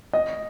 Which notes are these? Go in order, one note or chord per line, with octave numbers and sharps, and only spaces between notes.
D#5